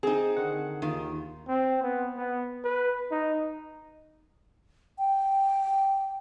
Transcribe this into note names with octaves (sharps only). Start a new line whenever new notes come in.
C4 D#4 G#4
D3 D#3 F#5
D#2 D#3 F4
C4
B3
B3
B4
D#4
G5